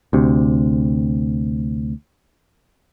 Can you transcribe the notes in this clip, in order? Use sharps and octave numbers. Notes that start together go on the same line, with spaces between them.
D2 C3